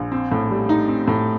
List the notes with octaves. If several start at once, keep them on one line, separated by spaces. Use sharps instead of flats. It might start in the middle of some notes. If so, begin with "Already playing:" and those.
Already playing: A#1
C4
A2
G3
D#4
C4
A2